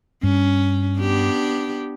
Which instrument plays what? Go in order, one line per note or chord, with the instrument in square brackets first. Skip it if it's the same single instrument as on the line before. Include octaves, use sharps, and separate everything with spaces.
[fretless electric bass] G2 [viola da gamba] C#4
[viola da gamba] B3 D4 G4